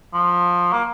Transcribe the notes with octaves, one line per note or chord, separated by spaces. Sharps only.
F3
A#3